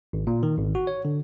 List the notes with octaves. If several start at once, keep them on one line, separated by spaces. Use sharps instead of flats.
G#1
A#2
D#3
G#1
F#4
C#5
D3